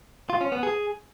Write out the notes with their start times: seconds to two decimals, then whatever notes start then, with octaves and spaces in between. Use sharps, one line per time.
0.30 F4
0.41 C#4
0.52 B3
0.63 G#4